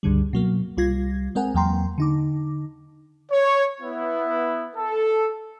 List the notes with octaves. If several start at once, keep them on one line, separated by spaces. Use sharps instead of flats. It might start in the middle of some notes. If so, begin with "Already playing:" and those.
C#2 G2 D3 G3
B2 F#3 A#3
C2 G3 F4 G#6 A#6
G#3 C4 A#4 F#5 G#5
E2 F#3 A#3 G5 A#5 C6
D3 D#4 D6
C#5
B3 E4
A4